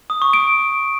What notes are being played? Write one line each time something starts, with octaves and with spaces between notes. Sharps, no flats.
D#6
C#6
D7